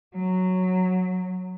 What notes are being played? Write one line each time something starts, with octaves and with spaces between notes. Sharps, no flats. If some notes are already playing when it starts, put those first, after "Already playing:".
F#3